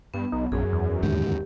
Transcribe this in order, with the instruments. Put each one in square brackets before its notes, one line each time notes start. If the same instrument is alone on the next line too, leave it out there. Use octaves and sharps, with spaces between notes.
[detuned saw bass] G2 [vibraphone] B3
[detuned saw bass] B1 [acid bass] D#4
[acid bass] A#1 [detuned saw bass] F#2 [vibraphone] G#4
[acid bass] E2
[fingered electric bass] D#2 G#2 D3 [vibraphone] G4